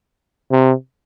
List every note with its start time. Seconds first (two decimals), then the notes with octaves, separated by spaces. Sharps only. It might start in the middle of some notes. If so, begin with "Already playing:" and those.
0.52 C3